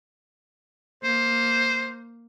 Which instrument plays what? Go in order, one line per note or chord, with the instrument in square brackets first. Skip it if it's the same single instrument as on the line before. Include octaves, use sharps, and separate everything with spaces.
[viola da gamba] A#3 [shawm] C5